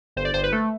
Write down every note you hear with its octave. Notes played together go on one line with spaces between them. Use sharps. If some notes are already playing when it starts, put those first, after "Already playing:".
G1 C5
D5
G1 C5
B4
A3 A4